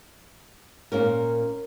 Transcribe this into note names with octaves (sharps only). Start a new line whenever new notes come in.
A#2 A#3 C#4 A#4